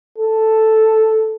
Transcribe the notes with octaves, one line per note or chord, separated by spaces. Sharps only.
A4